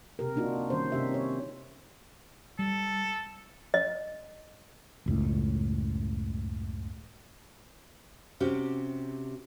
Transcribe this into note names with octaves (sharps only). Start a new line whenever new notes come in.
C3 G4 A#4
A#3 D4 D#4 F4 F#4
D#3 G3 C#4 C5
C3 C#4 D#4 G4 E5
C#5
G3 A4
D#5
F#1 C#2 A2
C3 C#4 F#4 G4